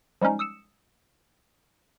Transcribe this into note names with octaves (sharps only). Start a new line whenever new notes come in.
F3 G3 G#3 C#4 D#4
D#6 E6 C#7 E7